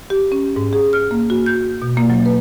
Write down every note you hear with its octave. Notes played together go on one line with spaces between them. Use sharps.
G4
C#4
G#2
G#4
F6
A#3
F#4
G6
B2
A#3
F#3
B4